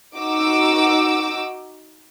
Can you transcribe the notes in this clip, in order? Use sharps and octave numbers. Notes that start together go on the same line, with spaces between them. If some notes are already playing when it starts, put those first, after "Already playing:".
D#4 F#4 D6 E6